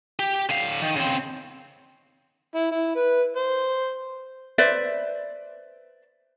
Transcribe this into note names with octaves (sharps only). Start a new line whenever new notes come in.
G4
D3 F5
D#3
C#3 C4
E4
E4
B4
C5
B4 C5 D5 E5